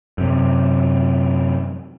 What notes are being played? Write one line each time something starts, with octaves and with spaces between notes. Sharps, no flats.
F#2 C3